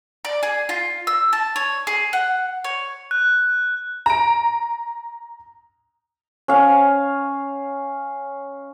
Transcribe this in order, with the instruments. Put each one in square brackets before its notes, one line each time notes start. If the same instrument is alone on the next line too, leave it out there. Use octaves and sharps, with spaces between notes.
[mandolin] D5
G#4
F4
E6
A5
C#5
G#4
F#5
C#5
[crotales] F#6
[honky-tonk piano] A#5 D7
[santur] C#4 F5